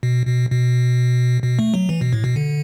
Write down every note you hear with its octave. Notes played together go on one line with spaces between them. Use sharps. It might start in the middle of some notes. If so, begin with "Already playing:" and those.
B2
B2
B2
B2
A3
F#3
E3
B2
A2
B2
D3